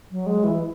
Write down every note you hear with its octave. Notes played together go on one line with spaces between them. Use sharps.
F#3
G#3
E3